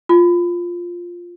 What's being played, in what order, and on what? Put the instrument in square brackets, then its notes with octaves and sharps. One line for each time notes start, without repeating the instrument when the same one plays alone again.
[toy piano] F4